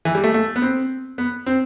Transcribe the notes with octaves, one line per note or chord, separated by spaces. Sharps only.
E3
G3
A3
A3
B3
C4
B3
C4